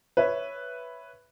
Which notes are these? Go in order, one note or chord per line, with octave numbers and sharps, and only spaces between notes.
B4 C#5 E5